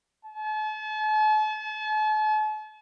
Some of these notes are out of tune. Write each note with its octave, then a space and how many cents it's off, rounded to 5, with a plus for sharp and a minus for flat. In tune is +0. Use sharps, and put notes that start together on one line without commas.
A5 -40